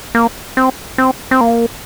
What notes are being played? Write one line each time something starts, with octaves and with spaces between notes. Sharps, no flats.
A#3
C4
C4
C4
A#3